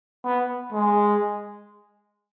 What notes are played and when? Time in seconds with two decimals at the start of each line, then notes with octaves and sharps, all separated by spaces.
0.25 B3
0.73 G#3